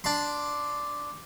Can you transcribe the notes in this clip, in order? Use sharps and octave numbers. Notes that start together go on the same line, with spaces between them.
D4 C6